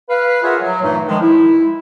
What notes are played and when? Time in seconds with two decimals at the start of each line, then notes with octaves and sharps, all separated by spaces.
0.09 B4 F5
0.43 F4 G#4 A#4 C#5 E5 F#5
0.62 F#3
0.82 G2 A#2 E3 A3 D#4
1.08 D#3 F3 G#3
1.22 E4